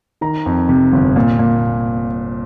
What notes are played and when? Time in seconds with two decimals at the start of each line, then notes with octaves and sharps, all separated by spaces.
0.21 D#3 A#5
0.46 F2
0.69 C3
0.93 G1
1.16 A#2
1.39 A#2